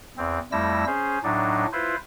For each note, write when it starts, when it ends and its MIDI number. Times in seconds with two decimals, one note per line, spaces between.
0.18 0.39 40
0.18 0.39 60
0.52 0.85 41
0.52 0.85 55
0.52 0.85 57
0.52 0.85 64
0.52 0.85 88
0.52 0.85 94
0.87 1.19 61
0.87 1.19 68
0.87 1.19 72
1.24 1.66 45
1.24 1.66 54
1.24 1.66 62
1.24 1.66 63
1.73 1.96 64
1.73 1.96 65
1.73 1.96 71
1.73 1.96 72